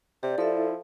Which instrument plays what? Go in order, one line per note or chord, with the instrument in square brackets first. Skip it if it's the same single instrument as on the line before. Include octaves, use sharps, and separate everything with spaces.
[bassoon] C3 [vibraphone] G4 [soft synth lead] D5
[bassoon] F3 [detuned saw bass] E4 [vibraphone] A4 E5